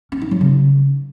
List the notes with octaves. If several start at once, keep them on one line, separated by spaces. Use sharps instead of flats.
C#4
D#4
F#3
C#3